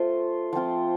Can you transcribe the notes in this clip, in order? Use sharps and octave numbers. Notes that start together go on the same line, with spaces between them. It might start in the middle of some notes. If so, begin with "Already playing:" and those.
Already playing: A3 F4 C5
F3 C4 F4